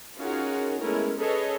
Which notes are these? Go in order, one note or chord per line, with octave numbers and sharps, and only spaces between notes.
C#4 D#4 F4 F#4 G#4 A#4
G#3 A3 B3 C#4 E4 A#4
C#4 G#4 A4 B4 C#5 D#5